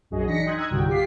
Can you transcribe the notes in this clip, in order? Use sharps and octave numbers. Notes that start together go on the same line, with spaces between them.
A#1 F#2 F#4 G#4 D#5
E3 D4 D#4 A#6 B6 C#7
D#5 G5 C6 D#6 F#6 G#6
A#5 D#6 E6 F#6 G#6
C2 G2 D3 F#4 G5
F4 G4 D6 B6 C7